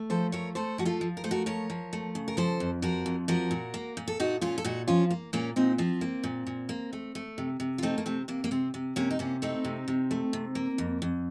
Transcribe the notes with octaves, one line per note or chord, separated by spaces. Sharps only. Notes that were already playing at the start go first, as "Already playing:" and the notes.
Already playing: A3
F3 A4 C5
A3 A#4 C#5
A3 A4 C5
F3 F#4
F4 A4
F3
A#4
A3 C5
F#4 A#4
F3 A#4 C#5
F3
A3
C#3
A#4
F3 A4 C5
F2
F3 F#4 A#4
F2
F3 F#4 A#4
A#2
A#3
A#2
A4
A#2 D#4 F#4
A#2 C#4 F4
A4
A#2 D#4 F#4
F3 C#4 F4
A#3
A#2 A#3 C#4
A#2 C4 D#4
F3 C4
A#3
A#2
A#2
A#3
A3
A3
C3
C3
F4
A3 C4 D#4
A#3
C3 C4
C3 A#3
A#3
C3 C4
C3
C3 A#3 C#4
D#4
C3 A#3 C#4
A3 C4 D#4
C3
C3
A3
C3
A#3
F2
F2